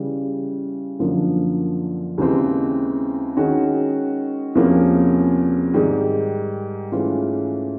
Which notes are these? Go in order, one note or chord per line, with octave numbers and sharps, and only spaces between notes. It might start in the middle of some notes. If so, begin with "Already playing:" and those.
Already playing: C#3 E3 G3
F#2 D3 F3 A#3
D#2 C#3 E3 G#3 C4
D#3 G#3 C#4 F#4
E2 C3 F3 A#3 C#4
G#2 D#3 G3
G#2 E3 A3 C#4 F4